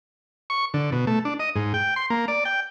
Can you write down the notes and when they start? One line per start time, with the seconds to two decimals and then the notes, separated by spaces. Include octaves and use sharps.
0.50 C#6
0.74 D3
0.92 B2
1.07 A3
1.25 D4
1.40 D#5
1.56 G#2
1.74 G5
1.96 C6
2.10 A#3
2.28 D5
2.45 G5